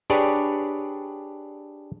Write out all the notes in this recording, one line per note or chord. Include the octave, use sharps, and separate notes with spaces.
D4 G4 G#4 B4 C#5 D5